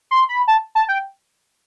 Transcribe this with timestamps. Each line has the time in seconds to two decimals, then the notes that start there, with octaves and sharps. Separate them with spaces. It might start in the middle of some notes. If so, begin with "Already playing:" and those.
0.11 C6
0.29 B5
0.48 A5
0.75 A5
0.89 G5